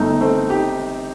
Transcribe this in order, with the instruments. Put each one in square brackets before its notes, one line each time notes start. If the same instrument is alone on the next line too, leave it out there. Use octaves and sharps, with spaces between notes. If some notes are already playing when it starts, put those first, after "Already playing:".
Already playing: [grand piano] G1 A3 [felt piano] D#4
[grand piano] A3 [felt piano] C4
[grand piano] D#4 [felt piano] G4